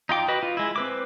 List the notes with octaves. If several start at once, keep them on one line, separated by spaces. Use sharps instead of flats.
D#4 F4 G5 D6
F#4 B4 D#5
F4
G#3 E4
C4 B4 D6